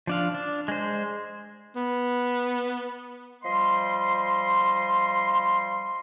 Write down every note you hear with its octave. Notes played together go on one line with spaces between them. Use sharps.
F3 D4 F5
D4
G#3 C5
B3
F3 G3 D#5 C6